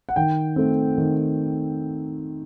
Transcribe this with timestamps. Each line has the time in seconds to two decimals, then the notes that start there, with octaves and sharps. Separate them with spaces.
0.09 F#5
0.16 D#3 G5
0.56 A3 C4
0.98 D#3